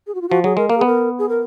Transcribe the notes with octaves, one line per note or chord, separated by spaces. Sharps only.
G#4
F#4
F4
F3 F#4
F#3 G#4
G#3 A#4
A#3 A#4
G#4
B3 A#4
G#4
A#4